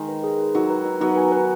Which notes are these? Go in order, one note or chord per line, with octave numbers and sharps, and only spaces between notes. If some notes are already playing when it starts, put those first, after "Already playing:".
Already playing: D#3 G#3
B4
G#4
B4
F#3 D#4
B4
D#4
F#3 B3 D#4
G#5
B4